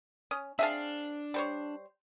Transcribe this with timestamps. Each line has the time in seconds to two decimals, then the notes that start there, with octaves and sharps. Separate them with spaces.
0.31 C#4 D#6
0.59 C4 D4 G#4 E5 F5 A5
1.34 G3 C5 C#5